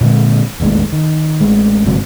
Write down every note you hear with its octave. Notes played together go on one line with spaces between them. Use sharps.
A#2 D3 G#3 C4
E1 A1 D#2 G#3
D#3
A1 G#3
G1 G#2 C3 F#3